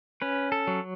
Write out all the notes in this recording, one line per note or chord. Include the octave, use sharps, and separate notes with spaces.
C#4 B4
A4
F#3